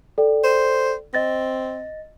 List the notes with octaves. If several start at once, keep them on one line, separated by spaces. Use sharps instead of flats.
A4 D5 G5
C5
C4 D#5 A6 A#6